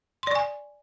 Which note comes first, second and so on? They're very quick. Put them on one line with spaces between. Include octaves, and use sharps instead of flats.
C6 D5 C#6 G#5